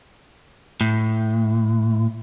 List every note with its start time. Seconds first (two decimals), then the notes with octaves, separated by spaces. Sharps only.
0.81 A2